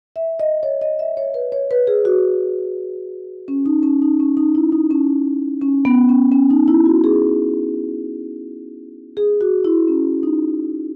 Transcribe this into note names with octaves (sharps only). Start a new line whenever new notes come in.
E5
D#5
C#5
D#5
E5
C#5
B4
C#5
B4
G#4
F#4
C#4
D#4
C#4
D#4
C#4
D#4
E4
D#4
C#4
C#4
B3
C#4
C#4
D#4
E4
F#4
G#4
G#4
F#4
E4
C#4
D#4